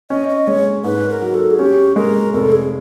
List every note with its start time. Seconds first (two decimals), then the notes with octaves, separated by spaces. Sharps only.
0.10 C#4 D#5
0.29 D#5
0.47 G#3 C#5
0.84 G#2 B4
1.09 A#4
1.22 F#3
1.34 A4
1.51 G#4
1.59 C#4 G4
1.96 G#3 A#4
2.33 F1 A4
2.52 G#4